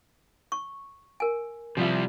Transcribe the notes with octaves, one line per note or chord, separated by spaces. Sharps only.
C#6
A#4 G#5
C3 F3 G3 E5